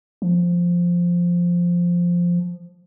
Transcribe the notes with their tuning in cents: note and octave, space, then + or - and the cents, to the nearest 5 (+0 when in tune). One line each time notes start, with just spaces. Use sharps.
F3 +0